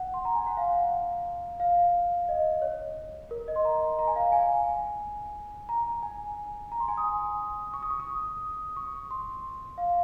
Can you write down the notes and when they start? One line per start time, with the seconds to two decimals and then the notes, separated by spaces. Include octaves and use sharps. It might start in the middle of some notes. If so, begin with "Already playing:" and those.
Already playing: F#5
0.14 C6
0.25 A#5
0.35 G#5
0.47 F#5
0.57 F5
1.60 F5
2.29 D#5
2.62 C#5
3.31 A#4
3.48 D#5
3.56 C6
3.65 A#5
3.99 A#5
4.07 G#5
4.16 F5
4.32 G#5
5.69 A#5
6.03 G#5
6.72 A#5
6.80 C6
6.88 G#5
6.97 D#6
7.74 C#6
7.83 D#6
7.90 C#6
8.00 D#6
8.76 C#6
9.11 C6
9.78 F5